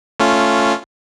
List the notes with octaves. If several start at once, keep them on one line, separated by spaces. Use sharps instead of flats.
A3 C#4 F4